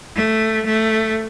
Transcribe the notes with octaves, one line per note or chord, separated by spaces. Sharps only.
A3
A3